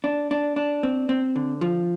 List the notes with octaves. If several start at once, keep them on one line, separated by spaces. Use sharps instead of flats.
D4
D4
D4
C4
C4
D3
F3